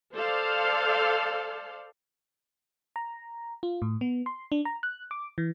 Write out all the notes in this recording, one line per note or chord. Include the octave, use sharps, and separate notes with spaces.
A4 C5 D5 F5
A#5
F4
A2
B3
C6
D4
A#5
F#6
D6
E3